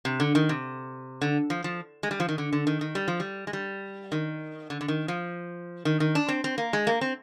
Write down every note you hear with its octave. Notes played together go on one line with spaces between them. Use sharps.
C3
D3
D#3
C3
D3
F3
F3
G#3
G3
F3
D#3
D3
D3
D#3
D#3
G3
F3
G3
G#3
G3
D#3
D3
D3
D#3
F3
D#3
D#3
D4
C4
C4
A#3
G#3
A#3
C4